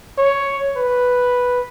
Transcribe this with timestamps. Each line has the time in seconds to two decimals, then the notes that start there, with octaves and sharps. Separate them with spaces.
0.18 C#5
0.77 B4